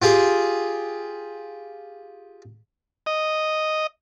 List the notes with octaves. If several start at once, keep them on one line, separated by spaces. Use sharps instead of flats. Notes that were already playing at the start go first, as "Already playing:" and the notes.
F4 G4 G#4
D#5